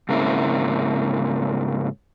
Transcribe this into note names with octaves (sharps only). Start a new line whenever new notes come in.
G#2 C#3 A#3 C4 E4